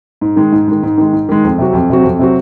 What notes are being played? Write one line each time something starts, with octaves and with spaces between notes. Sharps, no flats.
G#2
D#3 G#3
G#2
D#3 G#3
G#2
D#3 G#3
G#2
D#3 G#3
F2
C3 F#3 C4 F#4
F2
C3 F#3 C4 F#4
F2
C3 F#3 C4 F#4